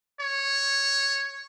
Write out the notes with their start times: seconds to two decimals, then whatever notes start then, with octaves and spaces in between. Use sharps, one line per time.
0.20 C#5